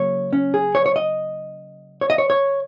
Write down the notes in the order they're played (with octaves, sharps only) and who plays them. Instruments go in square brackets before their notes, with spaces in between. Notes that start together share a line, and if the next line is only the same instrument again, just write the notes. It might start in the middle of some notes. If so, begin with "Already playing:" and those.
Already playing: [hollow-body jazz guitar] C#3 F#3 A#3 C#5
C#4
G#4
C#5
C#5
D#5
C#5
D#5
C#5
C#5